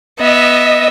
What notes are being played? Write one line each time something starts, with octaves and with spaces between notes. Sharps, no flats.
B3 D#5 E5